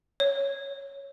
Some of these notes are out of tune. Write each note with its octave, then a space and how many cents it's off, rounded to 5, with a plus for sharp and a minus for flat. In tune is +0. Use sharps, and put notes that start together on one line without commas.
C#5 +0